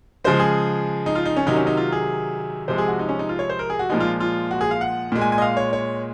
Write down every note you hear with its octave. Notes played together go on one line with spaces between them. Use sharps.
C#3 F3 G#3 C5
G#4
D#4
F4
D#4
C#4
C3 D#3 F#3 D#4
C#4
D#4
F4
G#4
C3 F3 G#3 C5
G#4
F#4
D#4
C#4
D#4
F4
C#5
C5
A#4
G#4
F#4
A#2 F3 G#3 D#4
F4
F4
F#4
G#4
F5
F#5
A#2 G#3
G#5
G#5
D#5
F5
C#5
C#5